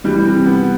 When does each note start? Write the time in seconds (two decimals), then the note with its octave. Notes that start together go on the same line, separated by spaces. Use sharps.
0.04 E3 G3
0.25 C3
0.46 B3